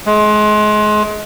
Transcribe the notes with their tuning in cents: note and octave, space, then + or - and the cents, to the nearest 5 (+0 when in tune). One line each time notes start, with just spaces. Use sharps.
G#3 +30